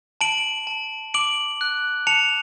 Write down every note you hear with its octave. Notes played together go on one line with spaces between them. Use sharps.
A5 D7 F#7
A5
D6 D7 F#7
F#6
A5 C#7 F7